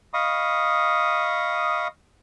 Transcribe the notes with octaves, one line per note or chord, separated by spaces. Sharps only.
D#5 F5 B5 C#6 D#6